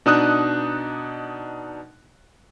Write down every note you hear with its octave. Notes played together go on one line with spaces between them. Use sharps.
B2 D4 D#4 D#6 F#6